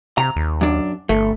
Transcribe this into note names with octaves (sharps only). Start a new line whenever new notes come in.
C3 A#5
D#2
F#2 D4
G1 A3